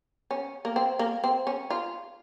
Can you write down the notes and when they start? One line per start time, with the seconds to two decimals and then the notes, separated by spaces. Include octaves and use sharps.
0.31 C#4
0.65 A#3
0.76 C4
0.99 A#3
1.24 C4
1.47 C#4
1.70 F4